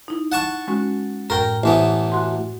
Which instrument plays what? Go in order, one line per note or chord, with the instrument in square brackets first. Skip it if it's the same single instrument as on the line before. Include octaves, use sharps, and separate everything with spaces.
[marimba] D#4 E4
[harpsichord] F#5 A5 C#6
[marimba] G#3 C#4 F#4
[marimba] F#2 A2 A#6 [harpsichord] A#4 G5
[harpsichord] A1 E3 B3 [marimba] C5 D#6
[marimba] F#4 F#5 C6